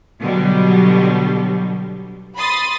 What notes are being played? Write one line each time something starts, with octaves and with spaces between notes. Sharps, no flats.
B2 D3 F#3 G3
B5 C6 D#6 A6